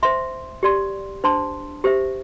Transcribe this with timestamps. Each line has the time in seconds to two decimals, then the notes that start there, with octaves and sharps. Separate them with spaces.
0.03 C5 E5 C6
0.63 G4 D5 C6
1.24 D4 C5 A5 C6
1.84 G4 C5 E5